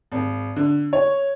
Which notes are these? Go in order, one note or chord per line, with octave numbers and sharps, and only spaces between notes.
G#1
D3
C#5